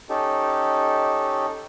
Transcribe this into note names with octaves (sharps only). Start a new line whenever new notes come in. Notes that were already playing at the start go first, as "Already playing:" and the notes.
C#4 D#4 G4 A4